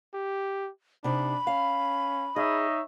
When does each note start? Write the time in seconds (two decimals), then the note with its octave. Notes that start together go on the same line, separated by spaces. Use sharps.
0.14 G4
1.04 C3 D4 D#4 B5
1.47 C#4 F5
2.36 D#4 G#4 C#5 D#5 E5